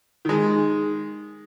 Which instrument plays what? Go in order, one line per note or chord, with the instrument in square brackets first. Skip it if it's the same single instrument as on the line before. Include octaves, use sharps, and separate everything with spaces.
[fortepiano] D#3 G#3